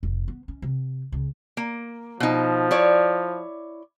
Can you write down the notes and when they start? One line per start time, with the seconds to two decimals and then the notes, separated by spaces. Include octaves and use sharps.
0.03 F1 A2
0.28 B3
0.48 C#4
0.62 C3
1.12 C#2 C#3
1.57 A#3
2.20 B2 F3 D#4
2.71 E4 C#5 D5